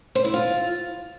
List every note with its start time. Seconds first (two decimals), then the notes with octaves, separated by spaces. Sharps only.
0.15 C5
0.24 E4
0.34 F4